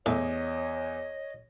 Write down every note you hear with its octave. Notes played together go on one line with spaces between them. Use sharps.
E2 A2 C#5 D#5